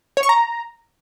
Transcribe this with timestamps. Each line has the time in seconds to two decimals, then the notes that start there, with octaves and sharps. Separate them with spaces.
0.17 C#5
0.23 C#6
0.29 A#5